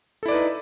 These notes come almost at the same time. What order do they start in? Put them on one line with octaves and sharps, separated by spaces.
A4 E4 D5 B4 D#4